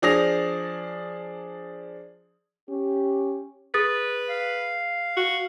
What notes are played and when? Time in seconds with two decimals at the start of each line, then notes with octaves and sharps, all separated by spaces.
0.02 F3 D4 G#4 D#6 A#6 F7
2.69 C#4 G4
3.74 G#4 B4 D#6 A6
4.29 F5
5.17 F#4